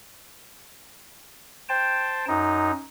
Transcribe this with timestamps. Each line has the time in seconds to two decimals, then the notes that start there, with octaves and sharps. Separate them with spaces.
1.69 C5 G5 A5
2.28 F#2 D#4